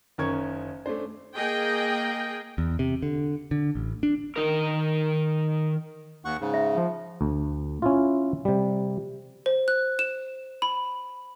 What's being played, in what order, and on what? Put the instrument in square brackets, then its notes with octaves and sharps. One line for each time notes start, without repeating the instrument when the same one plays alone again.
[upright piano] F#1 D#3 C#4 A#4 C#6 G#6
A3 C#4 D4 C5
[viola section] A#3 G#4 D#5 G5
[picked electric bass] E2
C3
D3
D3
A1
D4
[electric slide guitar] D#3 D#4 A#4
[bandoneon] D#2 F#5 C#6
G#2 C#3
[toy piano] E5
[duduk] F3
[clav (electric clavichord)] D2
C#4 E4 F4
C3 G3
[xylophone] C5
F#6
E7
B5